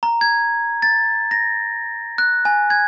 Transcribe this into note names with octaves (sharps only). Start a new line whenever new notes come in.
A#5
G#6
A6
A#6
F#6
G#5
G#6